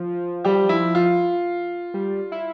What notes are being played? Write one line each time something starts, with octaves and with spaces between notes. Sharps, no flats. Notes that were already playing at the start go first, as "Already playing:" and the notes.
Already playing: F3
G3 G4
E4
F4
G3
E4